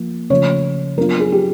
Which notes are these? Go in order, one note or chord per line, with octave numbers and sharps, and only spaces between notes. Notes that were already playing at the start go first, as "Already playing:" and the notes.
Already playing: F3 A#3 F4
C#3 F3 A3 C#5
F#3 B3 D4 F4 A#4
G#4
G4